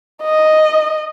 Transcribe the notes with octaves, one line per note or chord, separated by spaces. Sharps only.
D#5